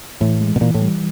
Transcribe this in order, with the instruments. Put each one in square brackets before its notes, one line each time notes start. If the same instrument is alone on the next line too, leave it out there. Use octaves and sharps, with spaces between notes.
[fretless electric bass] A2 [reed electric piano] E3
[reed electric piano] G#3
[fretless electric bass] B2
[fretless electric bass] A#2 [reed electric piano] E3
[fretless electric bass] A2
[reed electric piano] G3